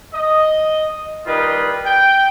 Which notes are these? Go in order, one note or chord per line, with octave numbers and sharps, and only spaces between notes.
D#5
D#3 G3 D#4 F4 B4 D#5
G5